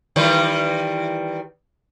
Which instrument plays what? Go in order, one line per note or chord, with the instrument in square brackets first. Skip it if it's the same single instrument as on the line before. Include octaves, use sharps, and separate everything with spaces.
[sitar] D#3 E3 G3